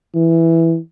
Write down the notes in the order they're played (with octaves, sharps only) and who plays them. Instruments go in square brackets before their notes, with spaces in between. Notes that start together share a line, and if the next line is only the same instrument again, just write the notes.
[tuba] E3